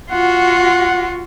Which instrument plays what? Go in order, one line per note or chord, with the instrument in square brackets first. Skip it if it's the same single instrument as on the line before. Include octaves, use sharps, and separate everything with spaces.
[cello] F4 F#4 [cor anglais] F#5